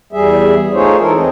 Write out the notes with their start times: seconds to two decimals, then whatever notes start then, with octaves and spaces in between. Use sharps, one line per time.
0.13 E2 G3 G#4 E5
0.73 A3 D#4 F4 G#4 C5 C#5
0.99 E3 G#3 A4 A#4
1.15 E2 G#3 C4 D#5